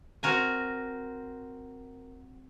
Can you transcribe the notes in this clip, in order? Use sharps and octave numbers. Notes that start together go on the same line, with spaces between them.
C4 F#4 A#4 G#5